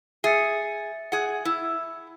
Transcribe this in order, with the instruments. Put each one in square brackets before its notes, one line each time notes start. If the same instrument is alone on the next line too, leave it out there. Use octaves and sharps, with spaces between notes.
[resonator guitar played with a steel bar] G#4 [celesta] E5 A6 C#7
[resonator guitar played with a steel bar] G#4 F#5
E4